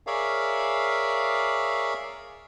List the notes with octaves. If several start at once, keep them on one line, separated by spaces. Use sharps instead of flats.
G#4 A#4 C#5 D5 E5 F5